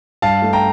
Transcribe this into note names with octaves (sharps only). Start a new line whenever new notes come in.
G2 F5 A5
A3
G5 A#5